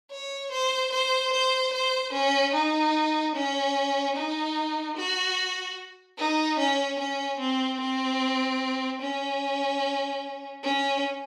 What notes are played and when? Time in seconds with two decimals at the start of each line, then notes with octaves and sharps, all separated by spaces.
0.11 C#5
0.51 C5
0.92 C5
1.32 C5
1.73 C5
2.13 C#4
2.54 D#4
3.35 C#4
4.16 D#4
4.97 F#4
6.18 D#4
6.59 C#4
6.99 C#4
7.40 C4
7.80 C4
9.01 C#4
10.63 C#4